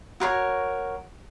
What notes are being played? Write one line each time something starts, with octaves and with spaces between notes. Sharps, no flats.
F#4 A#4 C#5